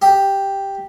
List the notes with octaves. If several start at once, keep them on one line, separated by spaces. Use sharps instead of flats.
G4